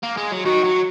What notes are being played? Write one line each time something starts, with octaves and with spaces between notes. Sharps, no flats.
A#3
G#3
F#3
D#3 F#4
F#3